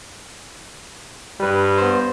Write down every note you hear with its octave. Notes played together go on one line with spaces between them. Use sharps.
G2 G3 B4
B3 C5